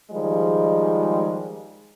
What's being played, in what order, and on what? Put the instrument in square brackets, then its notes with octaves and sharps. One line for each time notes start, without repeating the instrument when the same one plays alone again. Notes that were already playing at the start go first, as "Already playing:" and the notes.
[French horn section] D#3 F3 G3 G#3